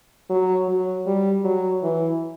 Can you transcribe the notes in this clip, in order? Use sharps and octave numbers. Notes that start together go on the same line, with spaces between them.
F#3
F#3
G3
F#3
E3